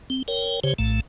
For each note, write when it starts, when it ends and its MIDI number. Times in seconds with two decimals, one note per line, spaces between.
0.10 0.23 60
0.28 0.60 70
0.28 0.60 73
0.28 0.60 79
0.64 0.74 49
0.64 0.74 67
0.64 0.74 72
0.64 0.74 73
0.79 1.00 34
0.79 1.00 45
0.79 1.00 57